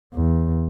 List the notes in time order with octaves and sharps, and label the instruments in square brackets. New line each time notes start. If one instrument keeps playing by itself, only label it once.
[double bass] E2